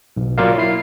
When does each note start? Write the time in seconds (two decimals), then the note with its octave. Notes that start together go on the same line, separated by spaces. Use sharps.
0.17 B1
0.38 F#3 A#3 F4 A#4 D5 F5
0.58 E4 C7